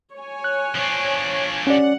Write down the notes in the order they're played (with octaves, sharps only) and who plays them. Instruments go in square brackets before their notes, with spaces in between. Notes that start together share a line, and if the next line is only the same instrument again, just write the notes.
[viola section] C#5 G#5
[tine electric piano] F#6
[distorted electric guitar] F3 D4
[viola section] G3 F#5 [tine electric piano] C#4 D5